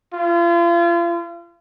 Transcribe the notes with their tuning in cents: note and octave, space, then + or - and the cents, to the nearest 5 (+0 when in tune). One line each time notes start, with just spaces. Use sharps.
F4 -35